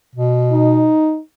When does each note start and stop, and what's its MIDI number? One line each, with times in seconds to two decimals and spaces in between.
0.16 0.92 47
0.52 1.20 63